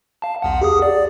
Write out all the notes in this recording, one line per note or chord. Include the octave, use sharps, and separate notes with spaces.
F5 A5
B1 E2 F#5
G4 G#4 D#6
D5